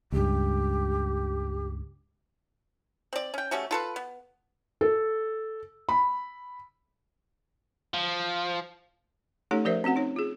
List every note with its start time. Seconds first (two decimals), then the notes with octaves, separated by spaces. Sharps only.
0.12 C#2 G2 G4
3.13 C4 D5
3.34 C#4 G5
3.51 G3 A3 C#4 F#4
3.71 F4 A4 B4
3.96 B3
4.81 A4
5.89 B5
7.94 F3
9.51 A3 C#4 D#4 G4 A4 C#5
9.65 F3 G4 A#4 C5 D5 E5
9.84 C4 C#4 F#4 F#5
9.96 D#4 C#5
10.16 F4 G#4